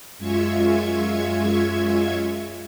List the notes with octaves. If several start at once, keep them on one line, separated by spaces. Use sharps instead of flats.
F#2 G#3 F4 E5 C#6 G#6